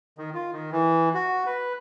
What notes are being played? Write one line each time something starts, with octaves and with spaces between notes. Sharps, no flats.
D#3
F4
D#3
E3
F#4
B4